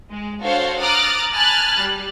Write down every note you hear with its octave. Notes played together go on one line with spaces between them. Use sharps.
G#3
D4 F#4 A4 C5 C#5 F5
A#5 D6 D#6 F6 F#6 A6
G#5 A5 B5 F6 F#6 A6
G3